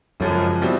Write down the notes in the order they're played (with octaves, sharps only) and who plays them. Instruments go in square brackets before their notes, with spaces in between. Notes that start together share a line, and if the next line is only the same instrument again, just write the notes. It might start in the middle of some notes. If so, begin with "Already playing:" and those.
[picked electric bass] F#2 [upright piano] C#3 F3 G#3
[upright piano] B2 G3 C4 E4